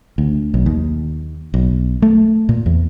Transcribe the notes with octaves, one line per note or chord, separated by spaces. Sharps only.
D2
B1
D#2
B1
A3
A#2
E2